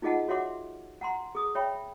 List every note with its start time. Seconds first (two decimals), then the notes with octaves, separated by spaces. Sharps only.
0.02 D#4 F4 G#4 D#5 F#5 A5
0.28 F#4 C#5 E5 F#5 C6 D6
1.01 F#5 A#5 C6
1.35 G#4 D#6
1.55 C#5 E5 G5 B5